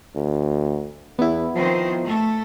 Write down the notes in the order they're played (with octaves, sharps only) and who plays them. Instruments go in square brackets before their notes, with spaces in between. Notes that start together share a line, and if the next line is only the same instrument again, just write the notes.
[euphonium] D2
[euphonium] E2 [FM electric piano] B3 E4
[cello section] D#3 C4 C5 [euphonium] F3
[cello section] A3 A4